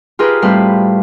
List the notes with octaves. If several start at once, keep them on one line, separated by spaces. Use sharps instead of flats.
F4 G4 G#4 A#4 B4
A2 G3 C4 B4 C5 F5